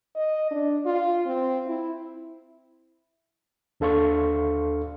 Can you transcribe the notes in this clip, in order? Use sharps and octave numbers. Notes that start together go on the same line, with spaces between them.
D#5
D4
F4
C4
E4
D#2 D4 A4 F5 C6 C#6